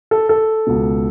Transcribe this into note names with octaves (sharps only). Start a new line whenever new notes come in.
A4
A4
C#2 B2